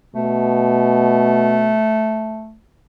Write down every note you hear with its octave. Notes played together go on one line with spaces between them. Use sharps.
B2 A3